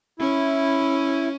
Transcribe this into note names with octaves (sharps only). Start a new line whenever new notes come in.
C#4 E4